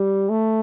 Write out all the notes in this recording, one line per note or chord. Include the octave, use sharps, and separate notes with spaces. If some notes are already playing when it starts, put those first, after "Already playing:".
Already playing: G3
A3